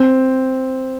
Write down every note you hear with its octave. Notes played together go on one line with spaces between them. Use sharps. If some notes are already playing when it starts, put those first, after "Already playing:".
Already playing: C4